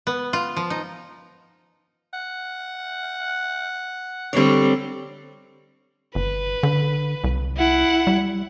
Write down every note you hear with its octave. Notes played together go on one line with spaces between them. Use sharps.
B3
F4
F3
D#4
F#5
D3 G3 C4 C#5
G1 B4
D3
C2
E4 F#5
G3